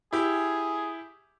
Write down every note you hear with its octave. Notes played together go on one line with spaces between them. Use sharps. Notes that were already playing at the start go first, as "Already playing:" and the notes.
E4 G4 G#4